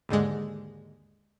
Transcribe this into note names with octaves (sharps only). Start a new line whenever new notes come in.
D#2 G#2 D3 G#3